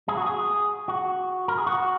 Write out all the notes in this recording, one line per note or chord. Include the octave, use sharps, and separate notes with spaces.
G#4
F#4
G#4
F#4
A#4
G#4
F#4